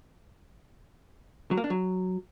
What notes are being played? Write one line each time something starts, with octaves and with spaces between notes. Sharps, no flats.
F#3
A#3
D4
F#3